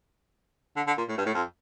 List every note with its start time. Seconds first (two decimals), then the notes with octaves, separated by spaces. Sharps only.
0.77 D3
0.87 D3
0.98 A#2
1.09 A2
1.18 G2
1.26 A2
1.34 F2